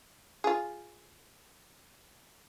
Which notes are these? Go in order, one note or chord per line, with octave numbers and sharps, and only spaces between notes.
F4 G#4